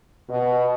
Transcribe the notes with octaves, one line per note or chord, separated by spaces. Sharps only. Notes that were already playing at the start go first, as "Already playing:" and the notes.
B2